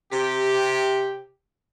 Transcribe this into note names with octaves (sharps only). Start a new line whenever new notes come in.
C3 G4